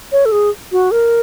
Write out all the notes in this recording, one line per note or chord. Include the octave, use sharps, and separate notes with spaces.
C#5
A4
G#4
F#4
A#4